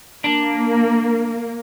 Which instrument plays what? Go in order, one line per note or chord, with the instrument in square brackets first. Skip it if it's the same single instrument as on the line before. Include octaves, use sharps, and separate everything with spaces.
[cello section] A#3 [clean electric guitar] D4